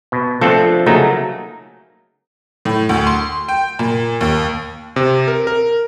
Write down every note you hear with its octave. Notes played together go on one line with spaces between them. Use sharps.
B2
F3 A3 C4 D4 A4
C#3 F#3 A3 A#3 D#4
A2
D2
C6
G5
A#2
D#2
C3
A#4
A#4